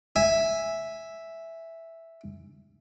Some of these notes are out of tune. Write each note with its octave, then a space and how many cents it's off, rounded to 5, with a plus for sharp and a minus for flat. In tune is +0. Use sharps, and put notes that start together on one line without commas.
E5 +0 G#5 -10